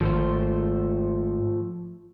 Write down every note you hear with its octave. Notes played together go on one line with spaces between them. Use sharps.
G#1 F3 A3 C5